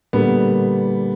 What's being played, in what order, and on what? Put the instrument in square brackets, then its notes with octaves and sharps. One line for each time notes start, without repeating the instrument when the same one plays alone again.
[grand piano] A#2 D3 G3 B3